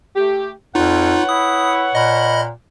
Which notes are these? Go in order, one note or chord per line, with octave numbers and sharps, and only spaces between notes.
A3 G4
F2 D#4 F4 B4 C#5 F#5
E4 D#6
A#2 D#5 B5